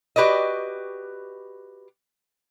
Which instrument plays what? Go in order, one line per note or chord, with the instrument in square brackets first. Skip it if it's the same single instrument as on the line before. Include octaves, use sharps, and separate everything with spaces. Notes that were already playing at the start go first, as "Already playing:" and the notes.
[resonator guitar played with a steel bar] F#4 G4 B4 D5 D#5